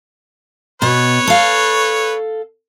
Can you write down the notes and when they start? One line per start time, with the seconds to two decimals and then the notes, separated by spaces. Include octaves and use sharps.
0.82 B2 B4 C#5
1.27 A4 F5